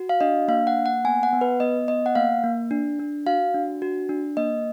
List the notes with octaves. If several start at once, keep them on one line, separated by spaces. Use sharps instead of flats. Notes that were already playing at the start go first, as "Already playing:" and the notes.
Already playing: F#4
F5
D4 D#5
A#3 F5
F#5
A#3
F#5
B3 G#5
F#5
B3
B4
B3 D#5
B3 D#5
F#5
A#3 F5
A#3
D4
D4
F#4 F5
D4
F#4
D4
A#3 D#5